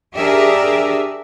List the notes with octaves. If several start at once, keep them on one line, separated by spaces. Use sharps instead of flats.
D4 G4 G#4 A#4 D5 E5